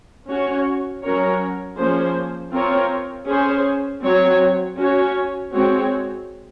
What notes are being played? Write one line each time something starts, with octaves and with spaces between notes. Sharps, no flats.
C#4 F#4 C#5
F#3 C#4 F#4 A#4 C#5
F3 A#3 C#4 G#4 C5
C4 F4 A#4 C#5
C#4 G#4 C5
F#3 C4 F#4 C#5
C#4 F#4 C#5
G#3 C4 F#4 C#5